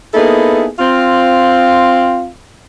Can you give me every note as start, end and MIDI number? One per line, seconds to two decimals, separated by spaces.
0.14 0.68 58
0.14 0.68 59
0.14 0.68 63
0.14 0.68 64
0.14 0.68 68
0.14 0.68 69
0.79 2.27 60
0.79 2.27 65
0.79 2.27 77